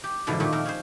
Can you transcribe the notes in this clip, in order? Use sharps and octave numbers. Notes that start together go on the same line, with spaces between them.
G4
G#2 B2 D3 E3 F3 A#3
A#2 D#3 F3 A3 B3 G4
F3 C4 D#4 A#4
C#4 G#4 C5